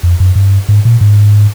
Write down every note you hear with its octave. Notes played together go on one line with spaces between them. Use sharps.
F2
F#2
G2
G#2
A#2
G#2